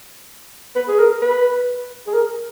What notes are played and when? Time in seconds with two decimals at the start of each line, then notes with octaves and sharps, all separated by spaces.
0.76 B4
0.88 G#4
0.99 A#4
1.22 B4
2.07 G#4
2.14 A#4